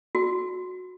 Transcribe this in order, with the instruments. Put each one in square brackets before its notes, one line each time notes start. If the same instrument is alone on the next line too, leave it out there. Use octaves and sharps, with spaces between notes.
[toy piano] F#4